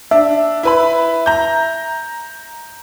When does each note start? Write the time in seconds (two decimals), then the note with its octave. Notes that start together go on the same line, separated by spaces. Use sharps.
0.11 D4 E5
0.63 E4 B4 B5
1.26 A#5 G6